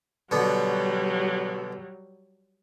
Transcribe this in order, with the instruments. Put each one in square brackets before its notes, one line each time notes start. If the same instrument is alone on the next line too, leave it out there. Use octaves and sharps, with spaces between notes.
[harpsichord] B2 D3 B3 [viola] F#3 G3